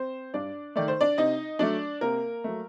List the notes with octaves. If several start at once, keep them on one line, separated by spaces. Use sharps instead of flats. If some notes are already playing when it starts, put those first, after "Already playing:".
Already playing: C4 C5
G2 D4 D5
D#3 A3 D5
C5
D4 D5
C3 D#4 D#5
F#3 A3 D4 D5
C3 A#3 A#4
F#3 A3